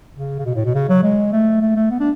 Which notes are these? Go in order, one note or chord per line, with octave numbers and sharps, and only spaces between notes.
C#3
C#3
B2
A2
B2
C#3
F#3
G#3
A3
A3
A3
B3
D4